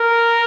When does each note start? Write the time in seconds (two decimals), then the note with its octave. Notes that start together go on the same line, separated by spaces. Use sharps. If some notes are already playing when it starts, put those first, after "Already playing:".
Already playing: A#4